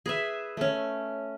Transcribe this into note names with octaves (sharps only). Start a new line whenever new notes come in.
G#4 B4 E5
A3 C#4